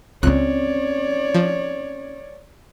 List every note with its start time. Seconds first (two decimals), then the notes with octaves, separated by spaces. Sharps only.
0.23 C#2 C4 C#4 C#5 D5 F#6
1.34 F3